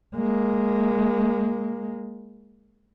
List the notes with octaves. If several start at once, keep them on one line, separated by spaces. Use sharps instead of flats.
G#3 A#3